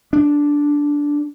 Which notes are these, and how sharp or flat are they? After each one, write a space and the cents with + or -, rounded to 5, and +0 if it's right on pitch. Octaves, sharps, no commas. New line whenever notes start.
D4 -10